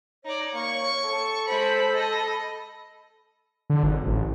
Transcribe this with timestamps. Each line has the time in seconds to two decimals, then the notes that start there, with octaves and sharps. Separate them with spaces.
0.24 D#4 C#5 D5
0.55 A#3 C#6
1.05 A4
1.47 G#3 C5 B5
1.96 D#5 B5
3.70 D3
3.83 G#1
4.07 A1